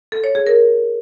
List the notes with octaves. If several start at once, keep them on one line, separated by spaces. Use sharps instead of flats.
A4
C#5
G#4
A#4